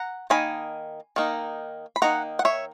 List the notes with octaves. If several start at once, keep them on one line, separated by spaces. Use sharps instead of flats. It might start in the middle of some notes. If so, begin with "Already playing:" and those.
Already playing: F#5 A#5
D#3 A#3 D#4 G#5 B5
D#3 A#3 D#4
B5
D#3 A#3 D#4 F#5 A#5
F#5
C#5 E5